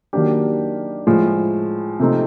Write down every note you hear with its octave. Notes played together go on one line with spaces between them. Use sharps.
D#3 F#3 A#3 D4 G4
A2 F3 G#3
C3 F3 A3 C4 D#4